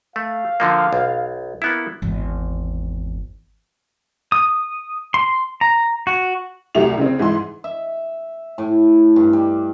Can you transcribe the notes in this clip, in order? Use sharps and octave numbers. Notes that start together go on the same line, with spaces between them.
A3 F5
D3 F3 A#3
B1
A#3 B3 E4
G#1 E2
D#6
C6
A#5
F#4
C2 F#3 A3 G4 F7
C#3 C4
G#2 E3 C6
E5
A2
G2
G3